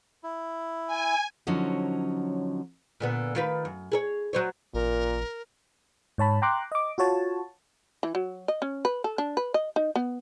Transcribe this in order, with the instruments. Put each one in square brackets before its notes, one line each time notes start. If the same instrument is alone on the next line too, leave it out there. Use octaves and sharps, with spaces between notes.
[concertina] E4
[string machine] G#5
[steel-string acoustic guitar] D3 F3 F#3 C#4 D#4
[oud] A#2 D3 B3
D#3 F4 B4
F#2
G#4 A4 C#5
F#3 C5 C#5
[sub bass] A1 [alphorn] A#2 [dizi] A#4
[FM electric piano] G#2 C#5 A5 B5
G5 A#5 C6 D6 F#6
D#5 D6
F4 F#4 C#5 A5
[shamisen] E3
F#3
D#5
C#4
B4
A4
D4
B4
D#5
D#4
B3